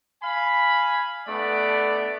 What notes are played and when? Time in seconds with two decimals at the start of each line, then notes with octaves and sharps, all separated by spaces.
0.23 F5 G#5 B5
1.27 A3 B3 D4 D5